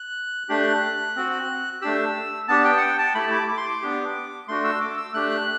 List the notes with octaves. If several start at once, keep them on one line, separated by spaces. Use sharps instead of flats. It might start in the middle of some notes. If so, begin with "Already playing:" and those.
Already playing: F#6
A3 D4 G4 F#6
C4 F#4
A3 D4 G4 E6
B3 D4 G4 A5
G5
F#5
G5
A5
A3 E4 G4 B5
D6
D6
C6
D6
B3 D4 G4
A3 D4 F#4 C6
E6
D6
E6
A3 D4 G4 F#6
F#6